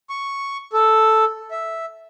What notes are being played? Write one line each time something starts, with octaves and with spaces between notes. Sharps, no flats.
C#6
A4
E5